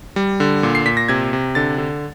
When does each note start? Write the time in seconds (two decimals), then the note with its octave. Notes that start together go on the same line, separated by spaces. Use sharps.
0.16 G3
0.40 D3
0.63 A#2
0.75 C7
0.85 A#2 B6
0.97 A#6
1.08 C3 G#6
1.33 C3
1.55 D3 A6
1.78 D3